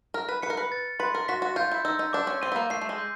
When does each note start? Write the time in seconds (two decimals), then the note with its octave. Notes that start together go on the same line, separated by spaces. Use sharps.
0.14 A#4 F6
0.29 B4
0.42 B4 C#7
0.50 A#4
0.57 B4
0.72 A6
0.99 B4 C6
1.15 A#4
1.28 F#4 B6
1.42 F#4
1.56 F4 G6
1.72 E4
1.85 D#4 E6
1.99 D#4
2.13 D4 D6
2.27 C#4
2.42 C4 D#7
2.52 B3
2.56 A#3
2.70 A3 C7
2.82 A3
2.89 G#3
2.98 G6